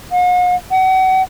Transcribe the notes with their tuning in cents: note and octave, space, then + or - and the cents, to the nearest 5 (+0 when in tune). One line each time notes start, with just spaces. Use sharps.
F#5 -45
F#5 +30